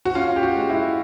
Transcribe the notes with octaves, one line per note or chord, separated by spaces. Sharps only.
F#4
C#4 F4
G4
F#4
G#3
E4